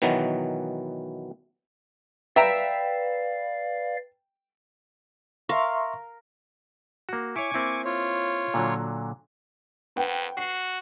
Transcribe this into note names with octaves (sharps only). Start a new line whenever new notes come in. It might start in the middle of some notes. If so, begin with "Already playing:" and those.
B2 D#3 E3 F#3 B3
B4 D5 E5 F5 G5 A#5
A#4 E5 F5 C6 C#6
A#3 F#4
E4 C#5 G#5 C#6 D6
A#3 C4 E4
F4 C#5
A#2 D3 F#3
F2 B4 F#5 G5
F#4 C7